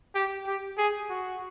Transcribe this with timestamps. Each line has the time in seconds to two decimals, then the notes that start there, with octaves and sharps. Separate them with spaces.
0.15 G4
0.47 G4
0.78 G#4
1.10 F#4